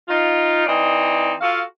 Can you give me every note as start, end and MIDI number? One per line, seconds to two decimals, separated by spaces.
0.09 0.64 63
0.09 0.64 65
0.67 1.34 52
0.67 1.34 60
0.67 1.34 63
0.67 1.34 74
0.67 1.34 75
1.41 1.62 65
1.41 1.62 66
1.41 1.62 69
1.41 1.62 77